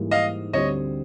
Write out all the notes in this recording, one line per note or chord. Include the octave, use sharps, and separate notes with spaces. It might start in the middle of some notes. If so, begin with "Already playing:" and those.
Already playing: G#2 E3 G3 A#3
D#5 F5
D2 D3 G3 C4 C#5 D#5